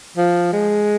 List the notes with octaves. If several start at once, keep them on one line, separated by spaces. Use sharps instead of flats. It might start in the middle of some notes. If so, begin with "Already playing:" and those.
F3
G#3